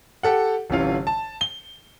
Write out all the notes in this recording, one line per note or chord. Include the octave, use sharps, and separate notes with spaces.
G4 A4 F#5
G1 C3 E3 C#4 F4 F5
A5
G7